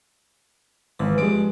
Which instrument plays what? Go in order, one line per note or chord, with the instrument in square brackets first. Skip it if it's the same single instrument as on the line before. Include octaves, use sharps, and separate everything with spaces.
[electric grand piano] G#1 [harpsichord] E3
[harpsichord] A#1 G2 [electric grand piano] G#3 D7